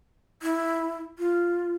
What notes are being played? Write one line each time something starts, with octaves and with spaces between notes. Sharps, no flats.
E4
F4